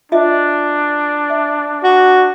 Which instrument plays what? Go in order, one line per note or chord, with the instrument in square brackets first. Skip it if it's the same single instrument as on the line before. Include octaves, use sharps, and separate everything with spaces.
[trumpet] D4 [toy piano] F4 D#5 E5
[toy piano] E5
[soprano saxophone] F#4